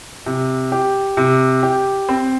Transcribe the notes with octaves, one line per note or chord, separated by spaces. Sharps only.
C3
G4
C3
G4
C4